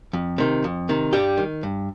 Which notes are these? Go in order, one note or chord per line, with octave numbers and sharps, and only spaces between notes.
F2
C3 D#3
F2
C3 D#3
G2 G3 G4
D#3
G2